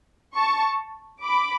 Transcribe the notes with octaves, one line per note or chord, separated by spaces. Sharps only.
A5 C#6
B5 D6